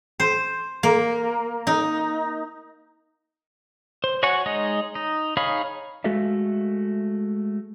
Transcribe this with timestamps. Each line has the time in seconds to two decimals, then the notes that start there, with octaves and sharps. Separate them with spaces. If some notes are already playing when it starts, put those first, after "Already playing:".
0.20 C5
0.83 A#3
1.67 D#4
4.04 C5
4.23 F#4 C#5 F#5 G#5 C#6
4.46 G#3 D#4 C#5 D#5
4.95 D#4
5.37 D#4 G#4 C#5 F5 B5
6.04 G#3 A3 F#4 A4 E5 F5